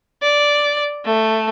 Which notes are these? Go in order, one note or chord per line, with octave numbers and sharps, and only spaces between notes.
D5
A3